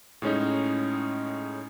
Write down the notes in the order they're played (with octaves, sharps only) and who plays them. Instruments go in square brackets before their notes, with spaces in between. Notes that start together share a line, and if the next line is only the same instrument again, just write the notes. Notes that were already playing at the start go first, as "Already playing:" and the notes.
[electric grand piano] A2 G#3 C#4 D#4